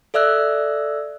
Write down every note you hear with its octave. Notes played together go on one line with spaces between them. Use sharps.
A4 D5 E5 E6 F#6